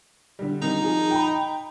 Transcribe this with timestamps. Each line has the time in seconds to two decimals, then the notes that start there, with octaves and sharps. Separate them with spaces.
0.39 D3 G3
0.62 D#3 G3 C4 D#4
0.82 F3 G#4
1.11 G5 A#5 B5